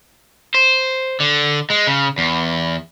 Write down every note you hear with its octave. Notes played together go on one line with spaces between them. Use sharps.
C5
D3
G#3
C#3
E2